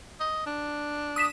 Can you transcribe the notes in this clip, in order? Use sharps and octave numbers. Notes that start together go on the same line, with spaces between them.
D#5
D4
D#6 B6 E7